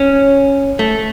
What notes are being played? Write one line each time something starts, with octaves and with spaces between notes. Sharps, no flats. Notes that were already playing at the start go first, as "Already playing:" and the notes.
Already playing: C#4
A3